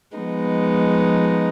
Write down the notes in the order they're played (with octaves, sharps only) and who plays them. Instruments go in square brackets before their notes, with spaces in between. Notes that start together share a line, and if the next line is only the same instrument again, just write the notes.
[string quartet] F3 G#3 B3 D#4